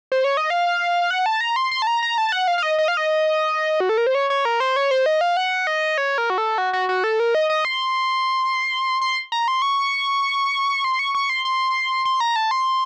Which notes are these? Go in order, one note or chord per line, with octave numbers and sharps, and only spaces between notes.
C5
C#5
D#5
F5
F#5
A5
A#5
C6
C6
A5
A#5
A#5
A5
A5
F#5
F5
F5
D#5
D#5
F5
D#5
F#4
A4
A#4
C5
C#5
C#5
A#4
C5
C#5
C5
D#5
F5
F#5
D#5
C#5
A#4
F#4
A4
F#4
F#4
F#4
A4
A#4
D#5
D#5
C6
C6
A#5
C6
C#6
C6
C#6
C#6
C6
C6
C6
A#5
A5
C6